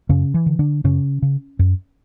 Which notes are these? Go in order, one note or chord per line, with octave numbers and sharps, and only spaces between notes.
F#2 C#3 C#4
E3
D3
D3 D4
F#2 C#3 C#4
C#3
F#2